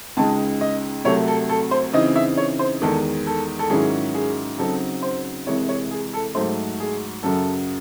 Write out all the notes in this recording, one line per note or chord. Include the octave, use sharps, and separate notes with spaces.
C#2 C#3 G#3 D#4 A5
D#5
C2 C3 F#3 A3 C#5
A4
A4
C5
C#3 E3 C4 D#4 D#5
E5
C#5
C5
E2 D#3 G#3 A4
A4
A4
G#2 D#3 F#3 C#4 E4 G#4
G#4
C#3 F#3 C4 D#4 A4
C5
C2 C3 E3 G#3 C#5
C#5
G#4
A4
G#2 F#3 A3 D#4 C5
G#4
F#2 C#3 F#3 A4